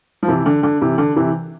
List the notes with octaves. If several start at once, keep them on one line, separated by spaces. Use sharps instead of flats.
F3
C3 E3
D3
D3
C3 E3
D3
C3 E3